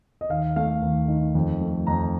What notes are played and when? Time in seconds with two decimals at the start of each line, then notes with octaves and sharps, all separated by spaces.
0.21 D#5
0.29 D#2 F5
0.56 A3 F5
0.82 D#2
1.08 D#3
1.35 F2
1.61 A3
1.87 F2 A#5